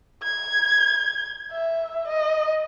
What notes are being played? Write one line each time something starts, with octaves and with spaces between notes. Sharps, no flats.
G#6
E5
D#5